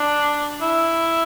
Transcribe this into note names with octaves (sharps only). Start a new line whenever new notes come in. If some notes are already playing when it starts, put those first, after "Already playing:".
Already playing: D4
E4